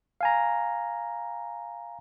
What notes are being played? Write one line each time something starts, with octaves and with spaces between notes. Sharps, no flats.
F5 G#5 A#5